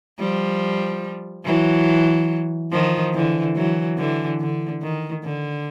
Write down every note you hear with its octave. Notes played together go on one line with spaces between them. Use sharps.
F3 G3
E3 F#3
D#3 F3
D3 E3
E3 F#3
D3 E3
D3
D#3
D3